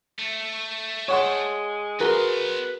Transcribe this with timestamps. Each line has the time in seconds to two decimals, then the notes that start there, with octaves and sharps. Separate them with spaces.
0.19 A3
1.08 G#3 C#5 F#5 C6
2.00 B3 F#4 G#4 A#4 B4 C6